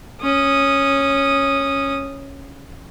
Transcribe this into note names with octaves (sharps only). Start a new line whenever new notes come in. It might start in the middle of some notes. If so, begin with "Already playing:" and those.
C#4 D#6